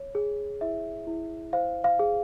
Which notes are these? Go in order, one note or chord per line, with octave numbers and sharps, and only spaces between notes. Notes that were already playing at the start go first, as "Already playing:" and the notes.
Already playing: C#5
G#4
E4 E5
E4
C5 F5
F5
G#4